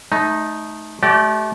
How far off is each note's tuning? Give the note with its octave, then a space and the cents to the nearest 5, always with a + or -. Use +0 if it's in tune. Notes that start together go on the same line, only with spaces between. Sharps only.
A3 -25 D#4 +0
A3 -30 G4 -40 D5 +0